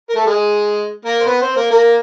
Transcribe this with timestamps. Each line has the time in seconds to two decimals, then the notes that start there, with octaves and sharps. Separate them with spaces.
0.10 A#4
0.16 A3 A4
0.26 G#3 G#4
1.05 A#3 A#4
1.21 C5
1.26 B3 B4
1.42 C4 C5
1.57 A#3 A#4
1.71 A#3 A#4